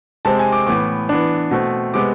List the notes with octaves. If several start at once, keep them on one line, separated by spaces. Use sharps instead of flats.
C3 G#3 C4 A5
G#5
D6
A2 E3 B3 D6
E3 B3 D4
B2 A3 C4
C3 G#3 B3 D6